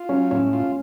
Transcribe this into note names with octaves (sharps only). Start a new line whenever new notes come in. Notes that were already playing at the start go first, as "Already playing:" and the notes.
Already playing: F4
F#3 C#4
A2 C#4
F4